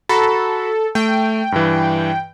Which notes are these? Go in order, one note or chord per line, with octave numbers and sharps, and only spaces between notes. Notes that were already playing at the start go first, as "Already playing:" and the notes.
F#4 A4 A#5 B5
A3 G5
G2 E3